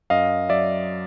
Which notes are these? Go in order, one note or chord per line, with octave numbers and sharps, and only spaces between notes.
F#2 D#5 F5
F#3 D5 E5